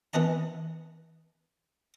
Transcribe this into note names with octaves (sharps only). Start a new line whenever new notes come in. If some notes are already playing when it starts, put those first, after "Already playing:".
E3 B3 B4 D#5 A5